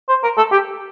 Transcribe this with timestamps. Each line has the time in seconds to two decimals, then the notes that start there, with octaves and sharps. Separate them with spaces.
0.09 C5
0.24 A#4
0.38 A4
0.52 G4